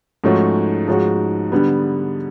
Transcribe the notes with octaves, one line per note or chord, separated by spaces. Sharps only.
G#2 F3 A3 C#4 F#4
G#2 F3 G#3 C#4 F#4
D3 G3 B3